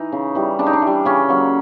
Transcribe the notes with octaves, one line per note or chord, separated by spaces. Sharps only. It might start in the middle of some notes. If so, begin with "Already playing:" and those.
Already playing: E3 D#4
C#3
E3 G3
C#3 D4
D#4
D4
E3 G3
C#3 C#4
F#3 A#3 C#4